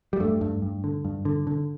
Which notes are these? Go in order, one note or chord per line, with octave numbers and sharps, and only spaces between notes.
G3
G2 A3
G2
G2
D3
G2
D3
D3